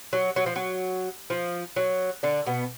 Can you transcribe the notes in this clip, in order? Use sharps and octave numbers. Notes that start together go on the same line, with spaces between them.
F#3
F#3
F3
F#3
F3
F#3
D3 D4
B2 B3